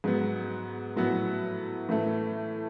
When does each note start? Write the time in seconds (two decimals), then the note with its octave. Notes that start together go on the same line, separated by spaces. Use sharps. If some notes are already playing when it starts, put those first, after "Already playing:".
0.04 G#2 F#3 B3
0.96 A2 F#3 B3
1.89 A2 E3 A3